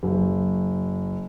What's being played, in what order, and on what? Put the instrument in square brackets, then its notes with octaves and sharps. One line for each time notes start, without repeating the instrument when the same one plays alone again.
[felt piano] F#1